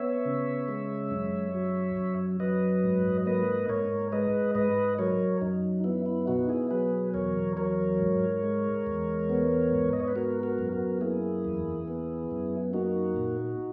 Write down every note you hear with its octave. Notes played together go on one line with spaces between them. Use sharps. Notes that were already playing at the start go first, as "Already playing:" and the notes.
Already playing: B3 C#5 E5
C#3
G#3
F#2
F#3
F#2
F#3 B4 D#5
G#2
A#3 B4 D#5
G#2 A#4 C#5
G#3 B4 D#5
G#2 B4 D#5
F#3 A#4 C#5
F#2 D#4
B3 E4
E4
B2 D#4 F#4
E4 G#4
F#3 G#4 B4
E2 A#4 C#5
F#3 A#4 C#5
G#2
G#3
E2
B3
G#2
D#5
C#5
B4
B3 F#4 A#4
F#4 A#4
F#2
F#4 A#4
A#3 E4 G#4
E2
B3
F#2
A#3 D#4 F#4
A#2